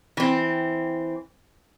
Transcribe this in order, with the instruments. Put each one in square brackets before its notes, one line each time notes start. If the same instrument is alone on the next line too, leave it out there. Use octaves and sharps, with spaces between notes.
[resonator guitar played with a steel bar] E3 C4